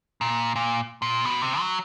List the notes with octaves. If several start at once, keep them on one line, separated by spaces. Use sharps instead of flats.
A#2
A#2
A#2
B2
C3
F#3